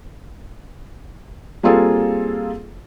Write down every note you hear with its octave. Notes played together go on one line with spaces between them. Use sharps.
G3 A#3 C4 F4 G#4 A4